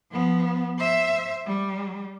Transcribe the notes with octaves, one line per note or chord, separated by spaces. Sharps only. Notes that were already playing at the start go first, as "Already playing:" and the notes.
F3 B3
C5 E5
G3